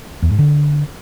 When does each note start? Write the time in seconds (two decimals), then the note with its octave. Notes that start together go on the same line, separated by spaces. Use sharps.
0.22 E2
0.30 G#2
0.38 D3